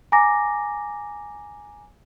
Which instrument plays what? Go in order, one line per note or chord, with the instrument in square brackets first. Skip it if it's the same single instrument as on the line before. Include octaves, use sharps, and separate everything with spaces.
[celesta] G#5 A#5 D6 A#6